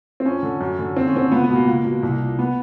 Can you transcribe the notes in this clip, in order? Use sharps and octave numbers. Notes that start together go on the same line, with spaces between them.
C4
F2 C#4
D3
F#2
D3
D#2 C4
C#4
D3 C4
C#2 B3
B3
B2
A#3
C#2
B2
C2
A#2
B3